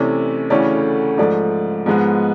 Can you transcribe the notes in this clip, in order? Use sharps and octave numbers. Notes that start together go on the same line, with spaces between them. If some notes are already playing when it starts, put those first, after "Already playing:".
Already playing: C3 E3 A3 C#4 D5
D2 C#3 E3 A3 C#4 D5
G#2 F3 A3 D5
G#2 F3 G#3 B3